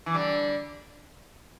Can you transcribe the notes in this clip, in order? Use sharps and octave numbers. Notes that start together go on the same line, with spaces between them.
E3
D3 G3